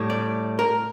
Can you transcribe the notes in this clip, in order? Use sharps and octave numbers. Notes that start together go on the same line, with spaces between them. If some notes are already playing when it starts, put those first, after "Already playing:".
Already playing: A2 G3
D5
A#4